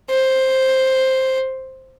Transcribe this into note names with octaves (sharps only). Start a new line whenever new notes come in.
C5